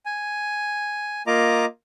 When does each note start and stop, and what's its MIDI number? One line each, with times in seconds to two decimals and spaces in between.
0.06 1.22 80
1.27 1.65 58
1.27 1.65 65
1.27 1.65 75
1.27 1.65 82
1.27 1.65 86